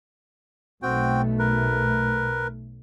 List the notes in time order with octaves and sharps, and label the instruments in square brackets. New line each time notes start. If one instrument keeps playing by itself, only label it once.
[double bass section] B1 B2 A3 [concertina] C4 F#4 G5
[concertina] A#4 B4